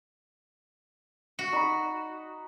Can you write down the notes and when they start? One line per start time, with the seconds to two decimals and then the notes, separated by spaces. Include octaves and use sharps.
1.39 F#4
1.53 D#4 B5